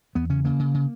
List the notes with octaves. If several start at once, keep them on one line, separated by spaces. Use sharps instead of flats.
E2 B3
C#3 C#4
C#3 A#3
C#3
C#3